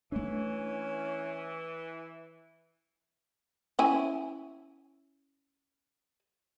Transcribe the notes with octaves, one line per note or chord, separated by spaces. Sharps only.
E3 A3 C#4 D4
C#4 E4 G#5